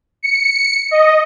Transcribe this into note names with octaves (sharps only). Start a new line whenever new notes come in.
C#7
D#5